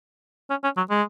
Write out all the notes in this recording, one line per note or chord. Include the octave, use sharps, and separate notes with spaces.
C#4
C#4
F#3
G#3